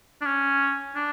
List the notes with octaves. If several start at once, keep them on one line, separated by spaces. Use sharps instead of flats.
D4
C#4
D4